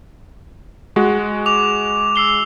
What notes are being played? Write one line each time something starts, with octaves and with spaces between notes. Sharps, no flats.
G#3 F#4
D6 F7
E6 C7 G7